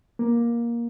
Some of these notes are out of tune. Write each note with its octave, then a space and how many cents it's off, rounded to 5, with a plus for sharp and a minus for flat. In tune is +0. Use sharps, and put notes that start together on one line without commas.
A#3 +15